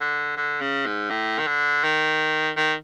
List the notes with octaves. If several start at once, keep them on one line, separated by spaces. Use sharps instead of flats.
D3
D3
C#3
G#2
A2
D#3
D3
D#3
D#3